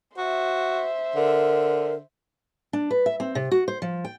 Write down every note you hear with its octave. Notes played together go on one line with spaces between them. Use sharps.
F#4 C5 E5
D3 A#4
D4
B4
E5
C4
C3
F#4
C5
F3
G5